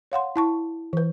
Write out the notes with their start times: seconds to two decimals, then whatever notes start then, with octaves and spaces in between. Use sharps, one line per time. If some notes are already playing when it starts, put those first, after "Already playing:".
0.12 C#5 F5 F#5 C6
0.36 E4 A5 C#6
0.93 E3 B4